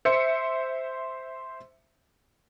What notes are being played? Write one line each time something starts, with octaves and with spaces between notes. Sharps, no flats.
C5 E5 C#7